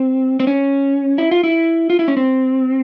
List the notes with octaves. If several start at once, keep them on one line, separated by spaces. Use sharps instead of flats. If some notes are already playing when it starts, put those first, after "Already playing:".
Already playing: C4
C4
C#4
E4
F4
E4
F4
E4
C#4
C4